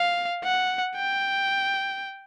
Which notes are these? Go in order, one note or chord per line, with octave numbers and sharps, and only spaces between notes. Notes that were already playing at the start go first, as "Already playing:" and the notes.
Already playing: F5
F#5
G5